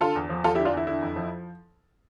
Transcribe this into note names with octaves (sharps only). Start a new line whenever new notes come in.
D3 F4 A4
E2
F3
E2 F4 A4
E4 G4
D3
D4 F4
E2 E4
D3 E4
F2
F3